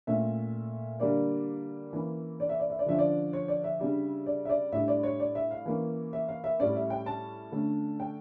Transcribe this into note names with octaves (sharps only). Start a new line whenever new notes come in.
A#2 A3 C#4 E5
D3 G3 A#3 D4 D5
E3 A#3 C#4
D5
E5
D5
E5
D5
D3 F3 C#4 E5
D5
C#5
D5
E5
C#3 G3 D4
D5
E5
D5
A2 G3 D4 E5
D5
C#5
D5
E5
F5
E3 A#3 C#4
E5
F5
E5
A2 G3 C#4 D5
E5
G5
A5
D3 A3 C#4
G5